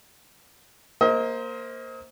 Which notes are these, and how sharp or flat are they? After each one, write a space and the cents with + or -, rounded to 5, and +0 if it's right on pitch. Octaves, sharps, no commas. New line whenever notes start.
A#3 +0 C5 +0 D#5 +35